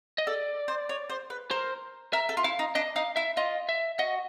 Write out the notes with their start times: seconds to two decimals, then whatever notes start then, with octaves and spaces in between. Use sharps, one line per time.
0.18 D#5
0.27 A4 D5
0.68 C5
0.89 C#5
1.10 C5
1.30 B4
1.51 A#4 C5
2.13 A#4 E5
2.29 A4
2.37 F4
2.44 E4 F5
2.59 D#4
2.75 D4 D#5
2.96 D#4 F5
3.16 E4 E5
3.37 F4 D#5
3.69 E5
3.99 F#4 D#5